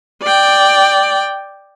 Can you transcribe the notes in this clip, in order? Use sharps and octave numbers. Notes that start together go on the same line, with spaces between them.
D5 G5